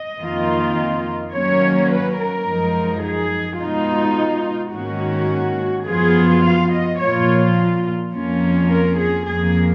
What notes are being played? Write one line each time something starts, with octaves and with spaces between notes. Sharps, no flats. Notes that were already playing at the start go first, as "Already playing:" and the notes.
Already playing: D#5
F2 D#3 A#3 F4
D#3 F#3 A#3 C#4 C#5
B4
A#4
F#2 F3 G#3 D#4
G#4
B2 G#3 D#4 F4
G#2 D#3 A#3 C#4 F#4
F#2 F3 B3 F4 G#4
F5
D#5
A#2 F3 A#3 F4 C#5
F2 F3 A#3 C#4 F4
A#4
G#4
F2 F3 A#3 G#4